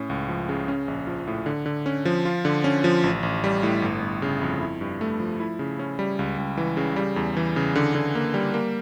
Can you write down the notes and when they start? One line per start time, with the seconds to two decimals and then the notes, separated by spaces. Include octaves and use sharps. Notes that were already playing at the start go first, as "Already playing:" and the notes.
Already playing: A2 C#4
0.10 C#2
0.28 F3
0.49 C#3
0.68 C#4
0.88 A#1
1.07 F3
1.27 A2
1.46 D3
1.66 D3
1.86 C#4
2.05 F3
2.25 F4
2.45 D3
2.64 C#4
2.84 F3
3.04 A1
3.23 A1
3.44 G3
3.63 A2
3.82 G1
4.02 G1
4.22 C#3
4.42 F2
4.61 E4
4.81 G2
5.01 A3
5.20 F3
5.40 E4
5.59 C#3
5.79 C#4
5.99 G3
6.19 C#2
6.38 C#2
6.57 E3
6.77 C#3
6.96 G3
7.16 E2
7.37 E3
7.56 C#3
7.76 D3
7.95 D3
8.15 A#3
8.34 G3
8.54 A#3